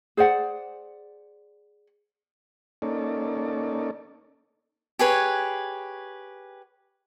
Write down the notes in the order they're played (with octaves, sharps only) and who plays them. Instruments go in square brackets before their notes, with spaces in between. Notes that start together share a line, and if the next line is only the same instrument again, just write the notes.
[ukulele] G#4 C5 D5 F#5
[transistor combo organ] A#3 C#4 D#4 A4 D5
[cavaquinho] G4 G#4 B4 C#5